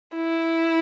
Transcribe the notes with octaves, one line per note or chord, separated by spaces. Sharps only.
E4